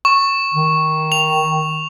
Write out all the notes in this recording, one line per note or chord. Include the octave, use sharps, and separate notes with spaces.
C#6
D#3
F7